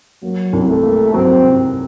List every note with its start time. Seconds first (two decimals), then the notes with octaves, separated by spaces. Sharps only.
0.22 F#3 A#3
0.53 C2
0.68 A3
0.84 A#3
1.13 F#3 C4
1.44 C3